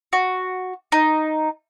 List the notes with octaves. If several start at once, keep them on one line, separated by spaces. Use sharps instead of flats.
F#4
D#4